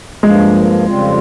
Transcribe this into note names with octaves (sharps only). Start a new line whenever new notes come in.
G2 F3 G#3 A#3
F2 C#3 G3 C4 F4